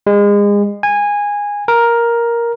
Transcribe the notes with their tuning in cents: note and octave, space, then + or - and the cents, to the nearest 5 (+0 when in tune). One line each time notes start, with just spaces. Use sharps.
G#3 -30
G#5 -15
A#4 +5